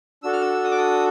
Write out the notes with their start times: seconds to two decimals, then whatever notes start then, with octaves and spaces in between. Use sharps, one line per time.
0.23 D4 F#4 A4 E6
0.33 F6
0.41 E6
0.64 D#6
0.71 D6
0.78 D#6